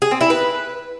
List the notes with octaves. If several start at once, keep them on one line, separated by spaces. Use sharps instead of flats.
G#4
C4
E4
B4